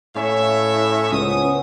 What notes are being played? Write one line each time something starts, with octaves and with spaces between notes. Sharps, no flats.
A2 C#4 C#5 E5 F5
C#2 B3 C#4 C5 D#6